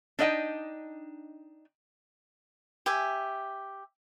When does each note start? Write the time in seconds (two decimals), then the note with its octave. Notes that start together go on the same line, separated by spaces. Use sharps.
0.19 D4 D#4 D#5 E5 G5
2.86 G4 E5 G#5